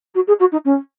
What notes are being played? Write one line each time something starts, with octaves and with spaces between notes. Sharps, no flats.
F#4
G#4
F#4
D#4
C#4